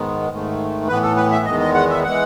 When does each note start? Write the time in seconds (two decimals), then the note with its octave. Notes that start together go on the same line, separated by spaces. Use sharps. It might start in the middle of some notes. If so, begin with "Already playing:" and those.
Already playing: G#2 D#3 G#3 B3
0.30 G#2 D#3 A3
0.87 A2 E3 B3 B4
1.02 A4
1.16 B4
1.31 E5
1.45 E2 D#3 G#3 B3 D#5
1.60 D#5
1.74 F#5
1.90 E5
2.04 E3 G#3 F#5